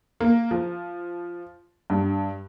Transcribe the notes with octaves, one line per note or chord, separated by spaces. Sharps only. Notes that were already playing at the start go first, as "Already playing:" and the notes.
A#3
F3
G2